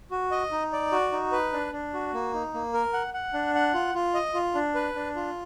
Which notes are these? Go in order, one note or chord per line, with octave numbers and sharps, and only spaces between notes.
F#4
D#5
D#4
D5
F#4
D#4
B4
D4
D4
F#4
A#3
D#4
A#3
A#4
F#5
F#5
D4
F#5
F4
F4
D#5
F4
D4
B4
D4
F4